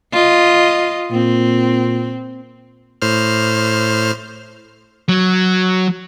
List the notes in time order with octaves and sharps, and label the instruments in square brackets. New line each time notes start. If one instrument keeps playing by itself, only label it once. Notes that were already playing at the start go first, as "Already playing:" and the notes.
[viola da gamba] F4 D#5
[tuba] A#2 [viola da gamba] C4
[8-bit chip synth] A2 C5 F6
[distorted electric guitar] F#3